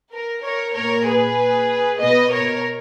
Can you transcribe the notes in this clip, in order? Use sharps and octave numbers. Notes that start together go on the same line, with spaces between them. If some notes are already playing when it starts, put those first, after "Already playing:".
A#4
A#4 C#5
A#2 A#4 C#5
G#4 B4
B2 B4 D#5
A#4 C#5